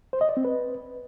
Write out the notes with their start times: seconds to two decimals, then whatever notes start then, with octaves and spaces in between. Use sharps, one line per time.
0.13 C5
0.21 D#5
0.29 D5
0.37 C4
0.45 B4